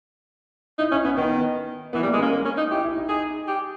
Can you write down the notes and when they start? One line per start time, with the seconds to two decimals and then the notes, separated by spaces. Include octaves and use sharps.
0.78 D#4 E4
0.91 C#4 E4
1.04 B3 C#4
1.16 D#3 B3
1.93 E3 B3
2.03 G3
2.06 A#3
2.13 G#3
2.20 A#3 C#4
2.32 A#3
2.45 C#4
2.57 D#4
2.71 E4 G4
2.84 E4
2.96 D#4
3.09 D#4 G#4
3.47 G4